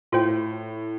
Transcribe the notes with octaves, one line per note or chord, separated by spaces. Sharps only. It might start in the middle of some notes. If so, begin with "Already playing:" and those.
A2 F4 C5 G5